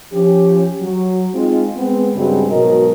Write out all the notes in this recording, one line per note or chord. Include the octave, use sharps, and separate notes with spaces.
F3 C#4 G4
F#3
G#3 C4 D#4 F4
G#3 B3 C4
G2 C#3 G3 G#3 C4 F#4
G#2 B2 F#3 A#4 D#5